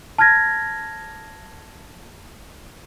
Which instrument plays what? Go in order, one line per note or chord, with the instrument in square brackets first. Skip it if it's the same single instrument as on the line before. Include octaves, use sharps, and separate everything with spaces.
[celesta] A5 F6 G6 G#6 A#6